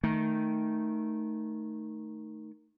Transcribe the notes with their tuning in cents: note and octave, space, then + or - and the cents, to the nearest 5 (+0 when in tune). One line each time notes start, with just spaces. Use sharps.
D#3 +0 A3 +0